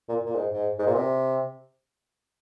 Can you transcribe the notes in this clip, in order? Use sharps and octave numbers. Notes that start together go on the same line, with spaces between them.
A#2
A#2
G#2
G#2
G#2
A#2
C3